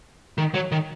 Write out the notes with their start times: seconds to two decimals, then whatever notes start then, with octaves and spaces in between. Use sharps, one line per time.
0.38 D#3
0.54 F#3
0.72 D#3